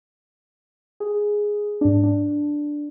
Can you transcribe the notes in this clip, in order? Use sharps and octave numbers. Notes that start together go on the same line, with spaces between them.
G#4
G#2 D4
D4